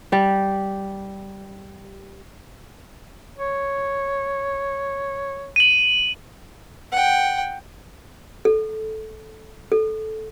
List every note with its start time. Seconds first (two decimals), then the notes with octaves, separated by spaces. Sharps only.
0.12 G3 G4
3.37 C#5
5.56 D#7 F#7
6.92 F#5 G5
8.45 A4
9.72 A4